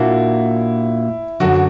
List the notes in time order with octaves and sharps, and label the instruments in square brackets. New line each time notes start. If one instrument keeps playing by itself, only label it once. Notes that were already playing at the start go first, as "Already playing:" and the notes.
Already playing: [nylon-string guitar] A#2 A#3 D4 F#4 [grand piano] E4
[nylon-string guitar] F#2 D3 F#3 [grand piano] F#4